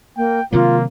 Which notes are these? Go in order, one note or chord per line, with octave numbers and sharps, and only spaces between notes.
A#3 G5
C3 D#3 F#3 A#3 F4